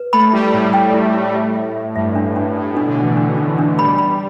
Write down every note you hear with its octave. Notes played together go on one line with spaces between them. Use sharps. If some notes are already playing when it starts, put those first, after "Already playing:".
Already playing: B4
A3 B5
G3 E4
A2 E4
A2 G5
E4
E4
E5
E5
E5
G2 E5
D4
G2 D4
A2 A4
B2 D4
D3
E3 D4
E3 D4
D4
D4
G3 B5
B5